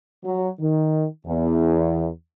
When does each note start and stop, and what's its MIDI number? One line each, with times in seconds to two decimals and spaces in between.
0.24 0.47 54
0.59 1.05 51
1.27 2.07 40